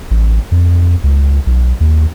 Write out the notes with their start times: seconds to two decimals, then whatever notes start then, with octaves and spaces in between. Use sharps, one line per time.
0.11 A1
0.52 F2
1.04 C#2
1.46 B1
1.80 D#2